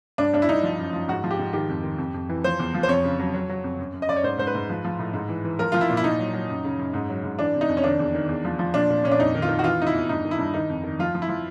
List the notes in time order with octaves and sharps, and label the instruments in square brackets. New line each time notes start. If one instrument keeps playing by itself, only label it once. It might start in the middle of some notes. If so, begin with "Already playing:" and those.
[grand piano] G2 D4
G2 D4
E4
G2 D#4
F3
F#2
F3
G#2 F#4
F3
G4
G#2
D#3 G4
F2
D#3
F2
F2
E3
F3 C5
E2
F3
C5
F2 C#5
C#3
F#3
F#3
F#3
F2
F#2
F#2
D#5
F#2 D5
C#5
G#2 C5
G#2 C5
B4
G#2
F3
F3
A2
G#2
E3
E3
F3 A#4
F3 F4
E4
A#2
E4
A#2 D#4
F#3
F#3
F#2
C#3
F#2
G#2
F#3
G#2
E3 D4
C3
D#4
F2
C#4
D#3 D4
E2
D#3
E2
F3
F3
A#2 D4
A#2
A#2 C#4
D4
F2 D#4
D#3
F4
D#3
F#4
E3 F4
C3 D#4
E4
E2
G2 D#4
D#3
E4
G2
D#3 D#4
F2
D#3
F3 F4
F3
E4
F3